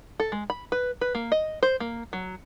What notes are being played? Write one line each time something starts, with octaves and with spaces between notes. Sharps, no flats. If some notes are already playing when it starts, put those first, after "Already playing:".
A4
G#3
B5
B4
B4
A#3
D#5
C5
A#3
F#3